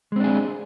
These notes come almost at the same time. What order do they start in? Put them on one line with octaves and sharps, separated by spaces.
G#3 C4 D4 G#4